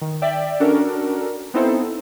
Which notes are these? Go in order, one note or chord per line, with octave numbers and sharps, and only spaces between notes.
D#3
D5 E5 G5
C#4 D4 F#4 A4 A#4
B3 C4 D#4 E4 A4 C5